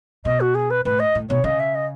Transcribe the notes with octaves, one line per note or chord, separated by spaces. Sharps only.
B2 D#5
F#4
G#4
B4
A2 B4
D#5
A2
B2 C#5
C#3 D#5
E5
D#5